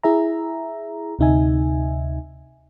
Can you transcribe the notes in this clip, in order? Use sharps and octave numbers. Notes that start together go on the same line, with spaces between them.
E4 G#4 E5 A#5
D2 C3 D#4 E5 G#5